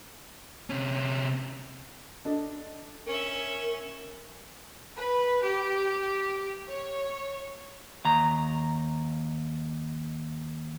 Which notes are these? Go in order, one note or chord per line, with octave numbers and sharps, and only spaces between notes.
C3 C#4
D4 A4 D#5
C#4 A#4 E5
B4
G4
C#5
D#2 A#5